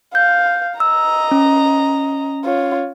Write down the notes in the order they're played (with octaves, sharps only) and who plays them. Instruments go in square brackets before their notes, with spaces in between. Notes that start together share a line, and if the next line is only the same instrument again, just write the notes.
[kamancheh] F5 [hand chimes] G6
[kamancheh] D#5 A#5 [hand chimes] E6
[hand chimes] C#4
[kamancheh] F4 C#5